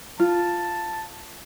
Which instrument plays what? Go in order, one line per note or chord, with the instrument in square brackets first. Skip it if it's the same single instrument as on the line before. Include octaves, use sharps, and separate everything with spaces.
[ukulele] F4 [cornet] A5